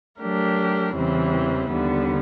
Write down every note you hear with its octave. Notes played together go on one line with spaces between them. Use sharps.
F#3 A3 D4 G4 A#4
E2 C#3 E3 G3 C4
D#2 D3 G3 B3